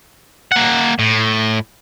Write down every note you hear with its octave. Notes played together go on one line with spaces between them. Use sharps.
A#3 F#5
A2